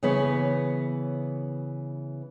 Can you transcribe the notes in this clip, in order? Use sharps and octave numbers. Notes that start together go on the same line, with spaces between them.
C#3 E3 B3 B4 C#5